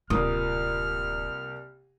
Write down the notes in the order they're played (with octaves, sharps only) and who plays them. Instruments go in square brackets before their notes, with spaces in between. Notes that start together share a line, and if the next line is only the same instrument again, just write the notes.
[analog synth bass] D1 [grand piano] C2 A#3 D#6 [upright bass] F4 [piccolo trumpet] F6